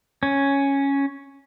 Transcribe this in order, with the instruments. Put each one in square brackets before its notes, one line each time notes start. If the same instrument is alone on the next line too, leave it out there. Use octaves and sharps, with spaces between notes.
[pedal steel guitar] C#4